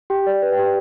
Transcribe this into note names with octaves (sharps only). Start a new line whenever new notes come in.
G4 G5
D5
B4
G5
G4